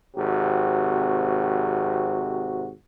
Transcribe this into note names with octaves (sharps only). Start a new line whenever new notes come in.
G#1 C3 F#4